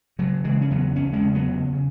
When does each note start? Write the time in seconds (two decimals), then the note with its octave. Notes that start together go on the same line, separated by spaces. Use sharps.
0.19 C#3 F#3
0.44 C#3 E3 G#3
0.61 C#4
0.70 E2 F#3 B3
0.96 E2 C#4
1.13 G#3 C#4
1.22 C#3
1.34 F#3 B3
1.48 C#3
1.73 C#3